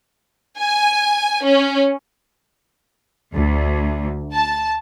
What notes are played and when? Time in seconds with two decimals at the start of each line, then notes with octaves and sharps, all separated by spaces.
0.59 G#5
1.44 C#4
3.35 D2
4.33 A5